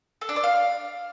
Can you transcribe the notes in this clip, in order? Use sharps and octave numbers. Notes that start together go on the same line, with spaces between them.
A4
D4
D5
F5